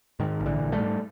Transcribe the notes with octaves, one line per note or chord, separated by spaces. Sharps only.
G#2 D#3
A#1
D3 E3
A#1
G3 A3
G#2